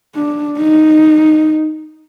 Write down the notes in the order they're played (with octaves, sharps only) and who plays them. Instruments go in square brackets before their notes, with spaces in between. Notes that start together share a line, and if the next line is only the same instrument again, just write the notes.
[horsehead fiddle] D4
D#4